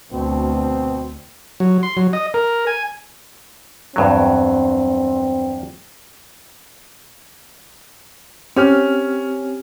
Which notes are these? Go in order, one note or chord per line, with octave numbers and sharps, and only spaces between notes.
D2 B2 C4
F#3
C6
F#3
D#5
A#4
G#5
E2 G2 F#3 C4
C4 C#4 G4 F6